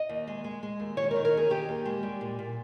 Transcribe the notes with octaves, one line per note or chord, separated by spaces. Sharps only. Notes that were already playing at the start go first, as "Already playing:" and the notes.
Already playing: D#5
D#2
G#3
G#3
G#3
D#2
D#3 C#5
A#4
D#3
A#4
D#2 G#4
D#3 G4
D#2
G#3
G3
A#2
A#2